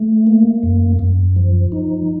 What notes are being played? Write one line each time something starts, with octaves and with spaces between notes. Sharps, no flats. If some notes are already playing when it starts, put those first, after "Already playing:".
Already playing: A3
A#3
F#2
F#2
F3
D#4